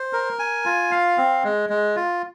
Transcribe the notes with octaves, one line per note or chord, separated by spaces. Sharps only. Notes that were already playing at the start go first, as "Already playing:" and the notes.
Already playing: C5
A#4
G#5
F4
F5
C4
G#3
G#3
F4